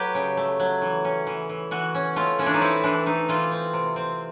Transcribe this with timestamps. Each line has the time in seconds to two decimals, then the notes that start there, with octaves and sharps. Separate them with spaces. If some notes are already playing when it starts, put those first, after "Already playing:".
Already playing: F#3 A3 G4 B4
0.15 C#3
0.37 A3
0.60 F#3
0.82 E3
1.05 C#4
1.27 E3
1.49 E3
1.71 E3 F#4
1.95 C#4
2.16 A3 F4
2.39 E3 C#4
2.46 D4
2.54 D#4
2.61 C4 E4
2.84 E3 D4
3.06 A3 D#4
3.29 E3 F4
3.51 C4
3.73 C3
3.96 C4